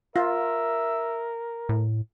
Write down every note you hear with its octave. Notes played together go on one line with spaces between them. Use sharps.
F4 A#4 E5
A2